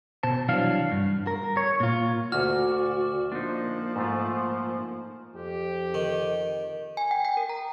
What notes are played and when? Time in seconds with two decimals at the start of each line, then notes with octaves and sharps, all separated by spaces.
0.23 B2 C5 A5
0.49 C2 E3 F#3 D4 F5
0.92 G2
1.27 A#4
1.57 C#5
1.80 A#2 F4
2.32 D2 F#4 D5 A#5 F6
3.32 A#2 F3 D4 D#4
3.96 G#2 A3 F4
5.35 F2 G4
5.94 D#3
6.97 G#5
7.11 G5
7.25 G5
7.37 A#4
7.49 A#5